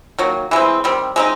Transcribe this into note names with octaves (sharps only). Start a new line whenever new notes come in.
D#3 F#3 A#3
E3 G#3 C4
D#3 G3 C4
G#3 C4 D#4